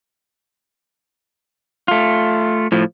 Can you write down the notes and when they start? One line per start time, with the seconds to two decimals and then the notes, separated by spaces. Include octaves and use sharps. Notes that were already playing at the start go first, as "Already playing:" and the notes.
1.88 A3 F4
2.72 A2 F3